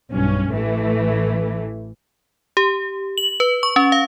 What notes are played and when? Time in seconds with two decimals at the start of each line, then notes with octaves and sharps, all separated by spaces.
0.11 B1 G2 C#4
0.52 A1 E3 A3
2.57 G4
3.18 F#7
3.40 B4
3.63 C#6
3.76 C#4
3.92 F5